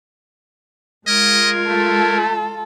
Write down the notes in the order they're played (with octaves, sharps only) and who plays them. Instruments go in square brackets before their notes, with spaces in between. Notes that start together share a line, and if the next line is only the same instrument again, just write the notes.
[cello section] G#3 F4 [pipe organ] A#4 G#6 [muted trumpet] D#5
[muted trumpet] A3 [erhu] A4